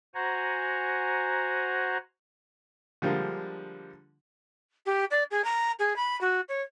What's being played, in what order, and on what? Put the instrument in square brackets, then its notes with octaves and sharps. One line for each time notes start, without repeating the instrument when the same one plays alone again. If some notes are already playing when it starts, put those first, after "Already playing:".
[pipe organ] F#4 C5 F#5 G#5 A#5
[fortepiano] D3 F3 G3 G#3 A#3
[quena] G4
D5
G#4
A#5
G#4
B5
F#4
C#5